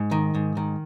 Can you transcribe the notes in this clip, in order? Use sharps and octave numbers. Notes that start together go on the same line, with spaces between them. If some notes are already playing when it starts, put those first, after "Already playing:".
Already playing: G#2
D#3
G#2
D#3